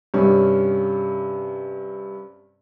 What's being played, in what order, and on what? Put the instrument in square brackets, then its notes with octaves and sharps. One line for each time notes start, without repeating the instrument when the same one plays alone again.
[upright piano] G2 C3 C#4